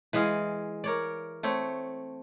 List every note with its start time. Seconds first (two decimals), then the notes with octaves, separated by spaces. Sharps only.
0.13 E3 G#3 G#4 F5
0.84 A#4 C#5 D5
1.43 A3 C4 C#5